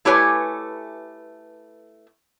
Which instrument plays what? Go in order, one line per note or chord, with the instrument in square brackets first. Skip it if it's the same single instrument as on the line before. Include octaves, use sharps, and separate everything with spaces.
[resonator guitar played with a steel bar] A3 E4 G4 B4 C#5 G#5